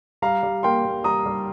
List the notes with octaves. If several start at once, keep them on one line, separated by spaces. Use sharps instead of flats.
G3 F5 A#5
G3
A#3 G5 C6
A#3
G3 A#5 D#6
G3